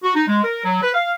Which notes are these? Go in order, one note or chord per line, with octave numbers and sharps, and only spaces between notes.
F#4
D#4
G#3
A#4
F#3
B4
F5